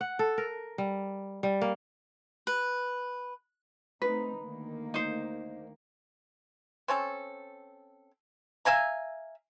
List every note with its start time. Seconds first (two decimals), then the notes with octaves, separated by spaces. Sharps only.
0.01 F#5
0.19 A4
0.38 A#4
0.78 G3
1.43 G3
1.62 A#3
2.47 B4
4.02 A3 C4 D#4 B4
4.37 D2 D#3 A#3
4.94 D#4 C5
6.88 C4 C#4 A4
8.65 E5 F5 G#5 A#5